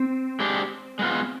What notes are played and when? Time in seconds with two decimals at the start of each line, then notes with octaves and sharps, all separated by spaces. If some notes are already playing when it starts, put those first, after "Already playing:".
Already playing: C4
0.40 G#3 D4 G4
0.99 G#3 B3 F4